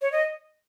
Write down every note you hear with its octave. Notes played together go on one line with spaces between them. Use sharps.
C#5
D#5